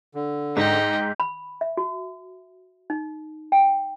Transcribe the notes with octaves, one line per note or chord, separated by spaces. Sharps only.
D3
G#2 D#4 G5 G6 B6
B5
E5
F#4
D#4
G5